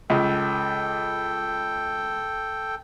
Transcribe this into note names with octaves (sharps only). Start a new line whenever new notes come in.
C#2 A4 G5